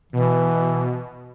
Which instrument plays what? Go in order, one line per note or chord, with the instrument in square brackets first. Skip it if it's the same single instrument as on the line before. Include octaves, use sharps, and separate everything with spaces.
[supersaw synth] B2 [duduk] E3